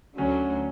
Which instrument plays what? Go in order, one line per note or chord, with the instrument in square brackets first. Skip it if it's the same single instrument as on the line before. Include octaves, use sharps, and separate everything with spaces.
[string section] D2 D3 F#3 A3 [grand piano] C#4